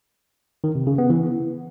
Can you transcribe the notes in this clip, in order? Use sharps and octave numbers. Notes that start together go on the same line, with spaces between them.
D#3
C3
C#3
B3
E3